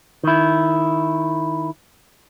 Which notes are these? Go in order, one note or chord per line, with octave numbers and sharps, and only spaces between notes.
D#3 E4